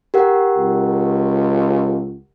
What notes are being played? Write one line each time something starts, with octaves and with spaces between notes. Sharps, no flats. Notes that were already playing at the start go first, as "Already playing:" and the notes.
G4 A#4 F#5
C#2